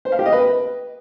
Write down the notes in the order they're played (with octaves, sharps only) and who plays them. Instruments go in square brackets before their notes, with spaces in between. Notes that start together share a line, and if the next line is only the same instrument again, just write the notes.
[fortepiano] C5
F5
G4
D#5
B4